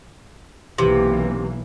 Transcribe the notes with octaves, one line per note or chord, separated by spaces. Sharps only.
B1 C3 E3 A#3